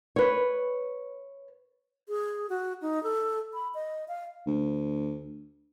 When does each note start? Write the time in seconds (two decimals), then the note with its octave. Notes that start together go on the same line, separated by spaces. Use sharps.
0.16 B4 C#5
2.09 G#4
2.50 F#4
2.81 D#4
3.03 A4
3.54 B5
3.74 D#5
4.08 F5
4.46 D2